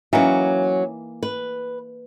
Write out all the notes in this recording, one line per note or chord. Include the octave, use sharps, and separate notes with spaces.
E3 F#3 A#3 C#4 D#4
B4